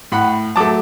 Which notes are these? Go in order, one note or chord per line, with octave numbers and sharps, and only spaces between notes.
A2 F#5 B5
F#3 A3 A5 D6